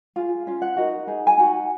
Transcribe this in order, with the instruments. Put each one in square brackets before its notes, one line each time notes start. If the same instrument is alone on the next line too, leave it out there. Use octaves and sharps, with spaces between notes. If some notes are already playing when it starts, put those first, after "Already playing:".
[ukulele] F4 G#4
C#4 F4
F#5
D#4 F#4 A#4
D#4 G#4
G#5
D#4 F#4